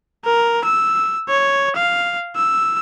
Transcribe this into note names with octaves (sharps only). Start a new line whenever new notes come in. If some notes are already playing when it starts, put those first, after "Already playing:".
A#4
E6
C#5
F5
E6